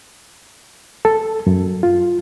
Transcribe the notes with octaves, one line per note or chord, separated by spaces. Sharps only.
A4
F#2
F4